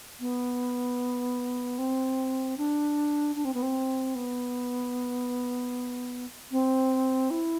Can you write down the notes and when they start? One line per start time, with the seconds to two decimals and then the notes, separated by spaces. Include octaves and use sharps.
0.21 B3
1.79 C4
2.58 D4
3.36 D4
3.45 C4
3.54 B3
3.63 C4
4.15 B3
6.52 C4
7.31 E4